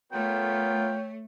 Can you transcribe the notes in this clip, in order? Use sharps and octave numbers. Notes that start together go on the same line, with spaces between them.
A3 B3 F4 A#4 C#5 G5